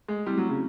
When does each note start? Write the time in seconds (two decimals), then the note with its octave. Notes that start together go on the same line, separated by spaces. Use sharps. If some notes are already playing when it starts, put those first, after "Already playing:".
0.08 G#3
0.26 G3 A3 C4 E4
0.38 F#3
0.50 C#3